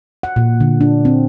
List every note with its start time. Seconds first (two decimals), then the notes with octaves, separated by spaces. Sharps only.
0.23 F#5
0.36 A#2
0.60 D3
0.81 D4
1.05 C4